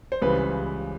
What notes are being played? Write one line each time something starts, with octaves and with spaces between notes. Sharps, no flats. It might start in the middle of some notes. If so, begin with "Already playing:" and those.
C5
C#2 C#3 E3 G3 B4